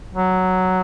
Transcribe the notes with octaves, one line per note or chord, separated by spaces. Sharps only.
F#3